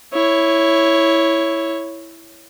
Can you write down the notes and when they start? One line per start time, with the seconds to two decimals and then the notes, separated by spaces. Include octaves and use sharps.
0.13 E4 C#5